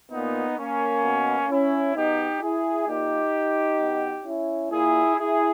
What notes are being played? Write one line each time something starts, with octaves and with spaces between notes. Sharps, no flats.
A#2 B3 D#4
A#3 C#4
B2
C#4 E4
B2 D#4 G4
E4 G#4
A#2 D#4 G4
B2
C#4 E4
A#2 E4 G#4
E4 G#4